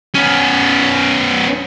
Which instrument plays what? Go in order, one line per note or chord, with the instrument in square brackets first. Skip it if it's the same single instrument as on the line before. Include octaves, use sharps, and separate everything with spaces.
[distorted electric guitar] B3 C#4